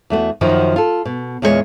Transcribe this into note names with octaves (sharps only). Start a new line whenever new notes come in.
E2 A3 F#4
F#2 D#3 F3 F#4
F4 A4
B2
E2 A#2 G#3 G4 C#5